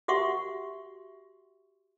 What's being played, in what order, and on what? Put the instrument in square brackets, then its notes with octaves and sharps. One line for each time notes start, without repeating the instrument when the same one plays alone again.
[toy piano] F#4 G4 E5 F#5 C6 C#6